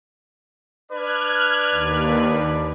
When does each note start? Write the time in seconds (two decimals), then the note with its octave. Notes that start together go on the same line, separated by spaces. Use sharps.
0.91 D4 B4 D5 F6 F#6 G#6
1.71 D#2